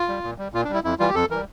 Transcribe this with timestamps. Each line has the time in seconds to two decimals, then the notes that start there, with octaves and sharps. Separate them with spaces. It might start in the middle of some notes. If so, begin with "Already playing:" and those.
Already playing: F4
0.09 G3
0.24 A#2
0.38 G3
0.53 A#2 F4
0.64 D4
0.69 G3 E4
0.84 F2 E4
0.99 E3 G3 F4
1.08 G4
1.14 F2 A4
1.30 E3 G3 A#4